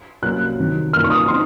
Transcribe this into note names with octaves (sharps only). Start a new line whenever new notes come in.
C2 C3 F#3 A#3 C#4 F#6
C2 C3 D#3 F#3
F#2 F3 A#3 D#4 F6
C#6
D#6
C4 D#4 C6